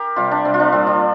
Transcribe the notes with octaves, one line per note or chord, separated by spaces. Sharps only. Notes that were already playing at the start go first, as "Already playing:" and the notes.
Already playing: G4 A#4
C3 G3 F4
D4
C3 G3 C4
F4
D4
A#2 G3 C4
D4